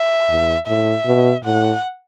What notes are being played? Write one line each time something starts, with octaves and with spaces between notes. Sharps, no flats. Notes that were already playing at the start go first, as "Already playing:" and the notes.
Already playing: E5
E2
A2 E5
B2
A2 F#5